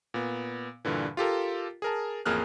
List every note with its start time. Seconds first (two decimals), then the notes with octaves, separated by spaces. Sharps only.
0.14 A#2 B3
0.85 G2 A#2 D3 E3
1.17 F4 G4 A4 A#4
1.82 G#4 A#4 A5
2.25 A1 F2 A#3 G#4 F6 F#6